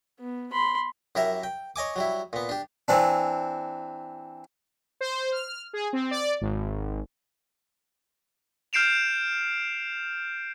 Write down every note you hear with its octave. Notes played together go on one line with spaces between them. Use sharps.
B3
B5 C6
F#2 E4 G4 A#4 E5
G5
C#5 D#5 G#5 D6
F#3 G3 E4
A#2 B3
D4 G4
E3 C4 D4
C5
F6
G#4
C4
D5
G#1
F6 G6 C7 D7 E7 F7